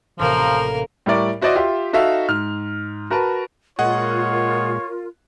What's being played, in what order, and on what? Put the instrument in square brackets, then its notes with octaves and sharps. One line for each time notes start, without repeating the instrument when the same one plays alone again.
[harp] A1 A2 C3 [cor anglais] F3 [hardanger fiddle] A#3 A#4
[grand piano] A2 G3 E4 A#4 D5 C#6
E4 F#4 C5 D5 D#5
F4 G4 E5
D#4 F#4 A4 E5 F5
G#2 F6
F#4 A#4 B4 A5
[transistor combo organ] A#2 G#3 [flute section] F4 A#4 [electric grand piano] G#4 D#5 F#5 [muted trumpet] C#5